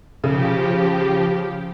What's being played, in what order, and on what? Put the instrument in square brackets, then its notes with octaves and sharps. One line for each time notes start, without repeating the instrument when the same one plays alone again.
[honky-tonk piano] C#3 [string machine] F3 G4